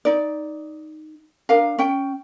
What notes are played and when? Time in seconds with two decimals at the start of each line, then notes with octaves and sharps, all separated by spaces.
0.05 D#4 D5
1.49 D4 A#4 F5
1.79 C#4 G5